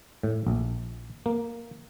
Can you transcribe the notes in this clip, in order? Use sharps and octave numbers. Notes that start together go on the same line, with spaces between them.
A2
A#1
A#3